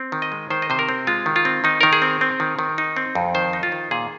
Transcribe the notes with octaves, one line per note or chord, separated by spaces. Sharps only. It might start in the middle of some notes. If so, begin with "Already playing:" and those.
Already playing: C4
D#3
D#5
G#3
D#3 C5
D#5
C3 C5
A#4
C4
G#3 F4
D#3
F4
C4
D#3 D#4
D#3 A#4
G#4
C4
C4
D#3
D#3
D#4
C4
F2
D#3 C5
D#4
F4
D#3
A#2 G#4